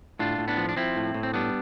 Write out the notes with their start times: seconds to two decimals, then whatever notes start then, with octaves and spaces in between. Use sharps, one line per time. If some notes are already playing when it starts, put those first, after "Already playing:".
0.19 A2 D4 F4
0.38 A2
0.48 B3 D4
0.57 F3
0.69 D4
0.76 F3 C4 E4
0.96 A2
1.14 A2
1.23 C4
1.34 G3 B3 D4